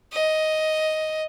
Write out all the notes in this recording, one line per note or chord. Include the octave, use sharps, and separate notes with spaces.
D#5